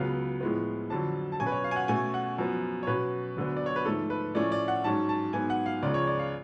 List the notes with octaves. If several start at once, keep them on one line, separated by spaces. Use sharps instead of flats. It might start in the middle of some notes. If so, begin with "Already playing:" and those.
Already playing: C#2 C#3 F#3 B3 F5
A2 F3 G#3 B3
F2 D3 F#3 A5
A5
B2 F#3 C#4 G#5
B4
C#5
F5
G#5
F#5
B2 A3 C#4 G#5
F#5
F#2 F3 B3
C#5
B2 F#3 C#4 B4
D2 D3 F#3 B3
D5
C#5
B4
G#2 F3 A3 A4
B4
A2 F3 A3 C#4 D5
D5
F#5
G#2 F#3 C#4 A5
A5
G#2 F#3 B3 G#5
F#5
F5
C#2 C#3 F3 G#3 C#4 D5
C#5
D5
F5